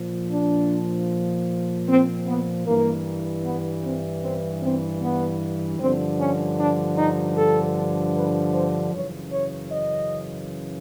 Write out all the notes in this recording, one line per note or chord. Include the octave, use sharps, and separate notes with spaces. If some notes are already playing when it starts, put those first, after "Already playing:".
Already playing: A#2 F3
D4
C4
B3
G2 E3 A#3
B3
C4
C4
C4
B3
G2 D3 F3 C4
C#4
D4
D#4
A4
B4
C5
F#2 C#3 E3 C#5
C#5
D#5